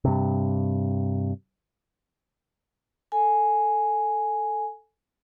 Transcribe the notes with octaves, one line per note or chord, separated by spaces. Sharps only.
G2 C3
A4 G#5